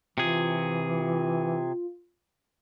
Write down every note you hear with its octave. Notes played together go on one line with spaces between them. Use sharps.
C3 E3 F4 G#4